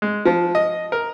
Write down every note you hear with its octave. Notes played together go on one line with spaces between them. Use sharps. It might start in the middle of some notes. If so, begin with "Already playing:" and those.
G#3
F3
D#5
A#4